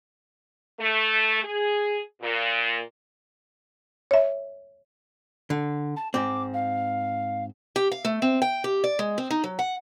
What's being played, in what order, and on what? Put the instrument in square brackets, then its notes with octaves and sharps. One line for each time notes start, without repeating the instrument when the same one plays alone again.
[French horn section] A3
G#4
A#2
[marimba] C#5 E5
[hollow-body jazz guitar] D3
[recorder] A5
[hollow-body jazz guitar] G#2 C4 [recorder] D6
[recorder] F5
[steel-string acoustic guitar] G4
F5
A3
C4
G5
G4
D5
G#3
C4
D#4
F#3
F#5